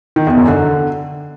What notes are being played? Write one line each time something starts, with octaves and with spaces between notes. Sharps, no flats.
D#3
E2
F#2
D3